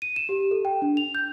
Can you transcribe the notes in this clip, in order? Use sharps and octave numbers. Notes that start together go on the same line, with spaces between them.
D#7
E7
G4
A4
G5
D4
F7
G6